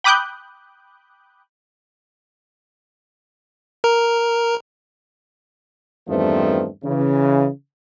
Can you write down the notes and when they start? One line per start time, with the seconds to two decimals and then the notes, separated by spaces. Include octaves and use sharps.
0.04 G5 B5 D6 D#6 F#6 G6
3.84 A#4 A#5
6.08 E2 G2 D#3 F3 A3 C4
6.84 C#3 E3